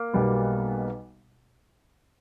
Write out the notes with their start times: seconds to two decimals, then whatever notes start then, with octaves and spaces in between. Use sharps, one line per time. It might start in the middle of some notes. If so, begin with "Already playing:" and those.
Already playing: A#3
0.13 B1 B2 G3 B3